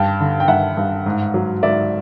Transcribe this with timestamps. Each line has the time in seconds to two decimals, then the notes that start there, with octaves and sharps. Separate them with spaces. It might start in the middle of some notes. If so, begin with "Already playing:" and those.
Already playing: G2 G5 A5
0.20 D3
0.40 G5
0.48 G2 E5 F#5
0.77 G2
1.06 G#2
1.34 F#3
1.63 G#2 D5 E5